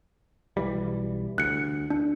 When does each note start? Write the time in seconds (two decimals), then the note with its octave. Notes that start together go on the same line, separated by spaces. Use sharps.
0.57 B1 E3 G3
1.38 D2 F#6 C#7
1.90 D4